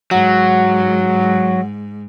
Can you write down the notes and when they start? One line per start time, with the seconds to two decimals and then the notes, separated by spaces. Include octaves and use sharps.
0.11 G#2 F#3 F#5